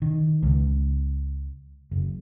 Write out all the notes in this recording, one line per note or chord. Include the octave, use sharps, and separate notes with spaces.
D#3
C#2
F#1